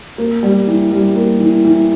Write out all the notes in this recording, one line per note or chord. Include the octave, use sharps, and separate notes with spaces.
A#3
G3
E3
G3
A#3
E3
E3